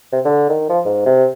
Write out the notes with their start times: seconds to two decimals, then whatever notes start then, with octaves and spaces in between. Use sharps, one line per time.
0.12 C3
0.25 D3
0.49 D#3
0.69 F3
0.85 G#2
1.06 C3